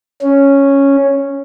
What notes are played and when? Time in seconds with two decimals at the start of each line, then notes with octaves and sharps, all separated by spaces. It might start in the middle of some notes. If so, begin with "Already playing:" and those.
0.22 C#4